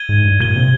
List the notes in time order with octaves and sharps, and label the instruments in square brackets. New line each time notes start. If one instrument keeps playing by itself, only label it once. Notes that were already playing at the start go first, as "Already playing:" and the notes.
Already playing: [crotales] G#6 D#7 G7
[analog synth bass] G#2
G2
[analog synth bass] A#2 [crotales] G#6 D#7 G7
[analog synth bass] C3